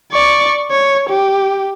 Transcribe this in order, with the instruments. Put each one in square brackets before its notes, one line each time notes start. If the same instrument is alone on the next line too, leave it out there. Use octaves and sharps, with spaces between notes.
[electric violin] D5 C#6
C#5
G4